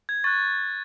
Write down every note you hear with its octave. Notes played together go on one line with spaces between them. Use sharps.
G#6
C#6 F#6 A6